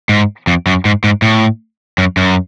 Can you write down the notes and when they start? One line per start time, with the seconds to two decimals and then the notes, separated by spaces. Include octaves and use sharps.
0.09 G#2
0.47 F2
0.67 F#2
0.85 G#2
1.04 G#2
1.22 A2
1.98 F#2
2.17 F#2